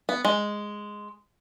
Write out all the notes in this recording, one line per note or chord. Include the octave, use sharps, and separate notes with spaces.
B3
G#3